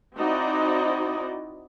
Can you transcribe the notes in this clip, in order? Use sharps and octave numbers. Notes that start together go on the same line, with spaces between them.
C4 D#4 E4 F#4 D5 D#5